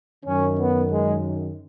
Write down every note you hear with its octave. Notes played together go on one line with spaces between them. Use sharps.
F#2 D#3 C#4
B3
G#3